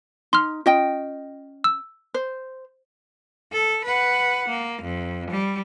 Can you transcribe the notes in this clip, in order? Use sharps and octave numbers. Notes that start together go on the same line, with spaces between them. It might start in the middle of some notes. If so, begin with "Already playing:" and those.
D#4 C6 F6
C#4 F4 D#5 G5
E6
C5
A4
B4 F#5
A#3
F2
G3